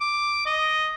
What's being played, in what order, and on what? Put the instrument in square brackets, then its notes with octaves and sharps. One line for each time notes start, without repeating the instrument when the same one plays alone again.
[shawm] D6
D#5